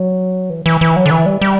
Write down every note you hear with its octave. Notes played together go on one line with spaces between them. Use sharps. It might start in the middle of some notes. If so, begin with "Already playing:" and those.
Already playing: F#3
E3
E3
E3
F#3
D3
E3
G3
G3